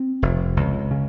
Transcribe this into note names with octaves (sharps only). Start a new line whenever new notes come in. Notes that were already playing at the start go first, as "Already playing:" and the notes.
Already playing: C4
F1
C#2
C#3